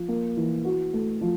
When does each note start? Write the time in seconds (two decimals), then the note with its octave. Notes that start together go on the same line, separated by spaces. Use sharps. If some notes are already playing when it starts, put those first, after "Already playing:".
Already playing: F3
0.08 A#3
0.37 E3
0.65 F#4
0.93 A3
1.21 F3